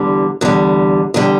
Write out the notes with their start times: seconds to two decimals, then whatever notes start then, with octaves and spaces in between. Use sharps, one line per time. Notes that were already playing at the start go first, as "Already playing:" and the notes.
Already playing: E2 D3 G3
0.41 E2 D3 G3
1.14 E2 D3 G3